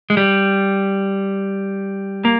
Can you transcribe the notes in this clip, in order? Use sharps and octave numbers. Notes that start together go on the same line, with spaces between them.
G#3
G3
A#3